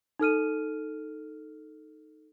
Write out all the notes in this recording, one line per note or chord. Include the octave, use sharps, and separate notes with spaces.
D#4 A4 F6 D#7